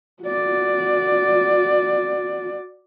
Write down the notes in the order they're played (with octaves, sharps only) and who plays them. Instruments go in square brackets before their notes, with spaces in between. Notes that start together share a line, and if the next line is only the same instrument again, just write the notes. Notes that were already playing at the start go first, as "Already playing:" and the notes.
[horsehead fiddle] F#4 D5